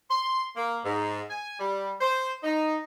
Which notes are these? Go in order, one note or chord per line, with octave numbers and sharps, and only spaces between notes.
C6
A#3
G#2
G#5
G3
C5
D#4